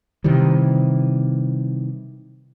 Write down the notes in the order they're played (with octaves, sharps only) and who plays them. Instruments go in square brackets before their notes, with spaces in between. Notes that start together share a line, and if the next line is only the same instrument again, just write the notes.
[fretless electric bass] C3 D#3 E3 G3